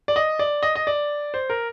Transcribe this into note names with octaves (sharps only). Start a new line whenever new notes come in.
D5
D#5
D5
D#5
D#5
D5
C5
A#4